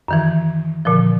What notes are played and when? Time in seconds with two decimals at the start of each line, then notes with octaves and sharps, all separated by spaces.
0.08 F#2 D#3 E3
0.85 A#2 D3 F3